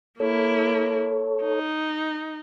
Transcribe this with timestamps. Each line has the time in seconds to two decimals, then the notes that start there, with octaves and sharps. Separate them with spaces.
0.20 A#3 E4 A4 C#5
1.44 D#4